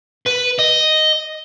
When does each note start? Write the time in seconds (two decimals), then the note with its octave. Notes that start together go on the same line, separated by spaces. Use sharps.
0.26 B4
0.59 D#5